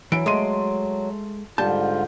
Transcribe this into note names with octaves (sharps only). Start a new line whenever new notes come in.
E3 F#3 D7
G#3 A3 C6 D#7
G#2 D3 G3 F4 A5 G6